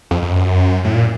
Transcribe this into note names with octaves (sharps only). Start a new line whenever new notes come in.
F2
F2
F#2
A2
A#2